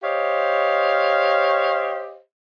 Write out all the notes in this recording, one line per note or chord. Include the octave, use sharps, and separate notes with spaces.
G4 C5 C#5 D#5 F5